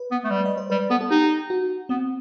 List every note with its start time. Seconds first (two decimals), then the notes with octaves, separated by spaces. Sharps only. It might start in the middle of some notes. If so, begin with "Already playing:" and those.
Already playing: B4
0.11 B3
0.24 A3
0.30 G3
0.45 D#5
0.57 C5
0.70 G3 B4
0.90 B3 A4
1.01 A4
1.11 D#4 G4
1.50 F#4
1.89 B3 C4